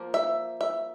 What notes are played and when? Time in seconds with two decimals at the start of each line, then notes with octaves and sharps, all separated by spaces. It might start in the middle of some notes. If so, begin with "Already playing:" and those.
Already playing: F3 A#3
0.14 E5
0.61 E5